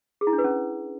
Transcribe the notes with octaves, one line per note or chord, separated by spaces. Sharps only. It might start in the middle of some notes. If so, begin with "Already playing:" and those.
G#4
E4
D4
B4
C#4